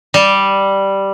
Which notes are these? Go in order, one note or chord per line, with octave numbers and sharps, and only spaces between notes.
G3